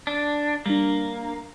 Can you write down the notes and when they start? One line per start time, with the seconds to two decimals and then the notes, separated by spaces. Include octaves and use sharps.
0.07 D4
0.66 G3 A#3 D4